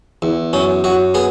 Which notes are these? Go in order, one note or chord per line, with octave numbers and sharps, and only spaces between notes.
E2
F#2 C#4
F#2 F#4
B3 G#4